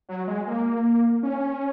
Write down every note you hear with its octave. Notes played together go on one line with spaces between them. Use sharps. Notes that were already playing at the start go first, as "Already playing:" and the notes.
F#3
G#3
A#3
C#4